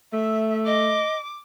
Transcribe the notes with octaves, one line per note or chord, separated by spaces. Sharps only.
A3 E5
D#5 D6